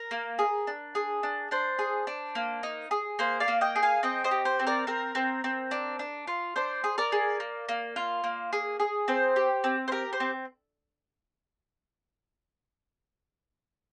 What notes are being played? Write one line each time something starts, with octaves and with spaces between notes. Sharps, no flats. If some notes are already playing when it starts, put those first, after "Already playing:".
Already playing: A#4
A#3
G#4
D4
G#4
D4
D4 C5
G#4
D4
A#3
D#4
G#4
A#3 C5
D5 F5
A#3
D#5 G5
G#4
F5 G#5
C4 D#5 G5
C5 D#5
G4
C5
C4
A#4 D5
C4 A#4
C4
C4
D4
D4
F4
D4 C5
G#4
A#4 D5
G#4
A#3
A#3
F4
A#3
G#4
G#4
C4 C5
G4
C4
C5
G4 A#4
C5
C4